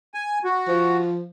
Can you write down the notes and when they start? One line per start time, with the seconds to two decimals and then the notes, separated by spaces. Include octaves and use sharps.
0.14 G#5
0.44 F#4
0.68 F3